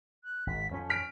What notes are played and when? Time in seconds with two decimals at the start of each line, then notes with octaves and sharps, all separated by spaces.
0.24 F#6
0.47 G#1 B6
0.71 F2 F3 C#4
0.90 F6 B6 D7